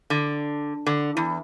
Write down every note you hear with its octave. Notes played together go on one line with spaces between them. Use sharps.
D3
D3
E2